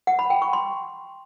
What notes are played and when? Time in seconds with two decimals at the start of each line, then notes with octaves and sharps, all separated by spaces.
0.07 F#5
0.19 B5
0.30 G5
0.42 C#6
0.53 C6